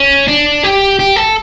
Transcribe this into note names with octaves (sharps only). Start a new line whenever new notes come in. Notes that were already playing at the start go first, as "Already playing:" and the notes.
Already playing: C#4
D4
G4
G4
A4